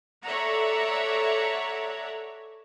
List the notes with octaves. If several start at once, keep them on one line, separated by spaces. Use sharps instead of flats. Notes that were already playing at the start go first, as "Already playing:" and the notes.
A4 C#5 D5 E5 F#5 A#5